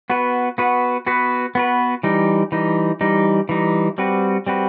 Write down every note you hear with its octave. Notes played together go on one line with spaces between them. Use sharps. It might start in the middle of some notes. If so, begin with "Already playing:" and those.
B3 F#4 B4
B3 F#4 B4
B3 F#4 B4
B3 F#4 B4
E3 G3 D#4
E3 G3 D#4
E3 G3 D#4
E3 G3 D#4
G3 C4 F#4 B4
G3 C4 F#4 B4